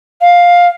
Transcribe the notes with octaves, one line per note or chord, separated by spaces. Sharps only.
F5